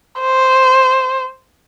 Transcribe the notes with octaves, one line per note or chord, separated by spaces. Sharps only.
C5